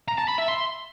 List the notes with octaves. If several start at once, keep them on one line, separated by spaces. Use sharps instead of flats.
A#5
A5
B5
E5
C6